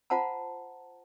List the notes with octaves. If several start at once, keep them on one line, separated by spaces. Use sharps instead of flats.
F4 C5 F#5 A5 A#5